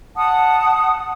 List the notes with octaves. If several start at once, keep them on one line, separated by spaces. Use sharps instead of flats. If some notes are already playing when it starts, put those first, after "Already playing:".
F#5 A5 D#6